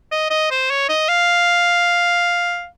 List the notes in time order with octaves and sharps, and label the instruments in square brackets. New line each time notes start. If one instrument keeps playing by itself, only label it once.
[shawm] D#5
D#5
C5
C#5
D#5
F5